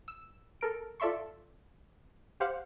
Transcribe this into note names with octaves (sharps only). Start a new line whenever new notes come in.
E6 E7
A4 A#4 D7
F4 A4 D5 E5 C6 C#6
G4 C5 F5 F#5